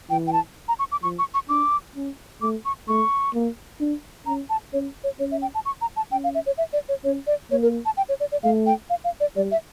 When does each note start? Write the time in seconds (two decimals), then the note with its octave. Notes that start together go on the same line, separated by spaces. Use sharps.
0.10 E3 G5
0.27 G5
0.33 A5
0.68 A#5
0.79 C#6
0.92 D6
1.03 F3 C#6
1.19 C#6
1.34 C#6
1.49 D4 D6
1.96 C#4
2.42 A3 D6
2.65 C#6
2.88 A3 C#6
3.34 A#3
3.80 D4
4.26 C#4 A#5
4.50 A5
4.73 C#4 C#5
5.04 C#5
5.19 C#4 C#5
5.31 E5
5.42 G5
5.55 A5
5.65 C#6
5.81 A#5
5.96 A5
6.12 C#4 G5
6.24 F5
6.35 E5
6.46 C#5
6.58 E5
6.73 D5
6.89 C#5
7.04 C#4 C#5
7.27 D5
7.51 A#3 C#5
7.63 A#4
7.85 A5
7.97 G5
8.09 C#5
8.20 D5
8.32 D5
8.43 A3 F5
8.66 G5
8.90 F5
9.04 F5
9.20 D5
9.36 G3 D5
9.51 E5